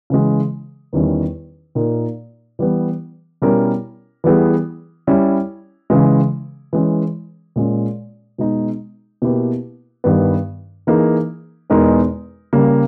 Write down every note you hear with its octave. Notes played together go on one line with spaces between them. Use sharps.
C#3 E3 G#3
E2 D#3 G3 C#4 E4
A#2 A#3 D#4 A#4
E3 G3 B3
B2 G3 C#4 E4 A#4
E3 G3 B3 E4 G#4
G3 C#4 E4
C#3 E3 G#3
E3 G#3 C#4
A#2 G#3 C#4
B2 G#3 D#4
B2 A#3 E4 G4 B4
G2 D#3 G3 B3
E3 A#3 D#4 G#4
E2 B2 G#3 D#4 A#4
C#3 G3 A#3